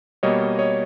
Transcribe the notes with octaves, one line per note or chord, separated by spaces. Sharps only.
B2 G3 A#3 C#5 D#5
C#5 D#5